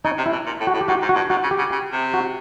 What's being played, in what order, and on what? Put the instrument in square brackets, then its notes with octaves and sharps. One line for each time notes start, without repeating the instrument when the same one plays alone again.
[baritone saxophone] C#3 [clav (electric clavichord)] D#4
[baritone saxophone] C3
[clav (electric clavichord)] E4
[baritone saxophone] B2
A#2
A2
[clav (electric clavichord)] F#4
[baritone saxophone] A2
[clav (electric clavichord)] G4
[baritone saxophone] G#2 [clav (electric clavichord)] F#4
[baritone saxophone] G#2
[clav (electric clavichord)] F#4
[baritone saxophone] G2
[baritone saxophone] G#2 [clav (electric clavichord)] F#4
[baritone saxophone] C#3
[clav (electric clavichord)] G4
[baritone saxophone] C#3
C#3
C3
[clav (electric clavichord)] F#4